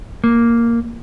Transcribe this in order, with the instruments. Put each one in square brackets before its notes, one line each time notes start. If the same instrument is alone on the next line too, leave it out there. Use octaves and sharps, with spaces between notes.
[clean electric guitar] A#3